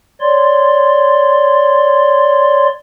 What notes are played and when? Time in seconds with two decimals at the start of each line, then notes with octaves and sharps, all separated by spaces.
0.21 C#5 D5 C6